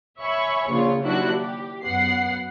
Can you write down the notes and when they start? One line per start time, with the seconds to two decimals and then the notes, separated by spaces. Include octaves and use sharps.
0.22 C#5 E5 G#5 B5 C#6
0.70 A#1 C#3 F4 C#5
1.03 D#2 F#3 D4 E4 F#4 F#6
1.40 G4
1.84 F#2 B3 F#5 C7